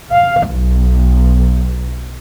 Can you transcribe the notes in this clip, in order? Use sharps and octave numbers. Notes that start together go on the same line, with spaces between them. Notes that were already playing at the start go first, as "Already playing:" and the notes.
F5
B1